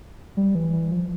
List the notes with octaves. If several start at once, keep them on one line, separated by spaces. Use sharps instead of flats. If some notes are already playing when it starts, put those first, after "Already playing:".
G3
E3
E3
F3